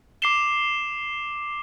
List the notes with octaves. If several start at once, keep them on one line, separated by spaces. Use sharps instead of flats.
D6 C7 E7 G7